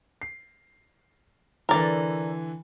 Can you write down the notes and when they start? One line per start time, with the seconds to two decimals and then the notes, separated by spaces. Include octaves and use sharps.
0.22 C7
1.69 D3 E3 A#4 D5